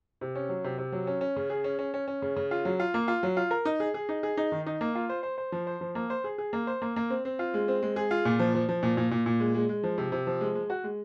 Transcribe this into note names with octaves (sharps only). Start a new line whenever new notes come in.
C3
C#4
F#3
C3
C3
F#3
C#4
C#4
C#3
G#4
C#4
C#4
C#4
C#4
C#3
C#3
F4
F#3
F4
A#3
F4
F#3
F4
A#4
D#4
G#4
G#4
D#4
G#4
D#4
D#3
D#4
A#3
F4
C5
C5
C5
F3
C5
F3
A#3
C5
G#4
G#4
A#3
C5
A#3
A#3
C4
C4
F4
G#3
C4
G#3
G#4
F4
A#2
F3
F3
F3
A#2
A#2
A#2
A#2
G#3
G#3
G#3
F3
C3
C3
F3
G#3
G#3
F#4
G#3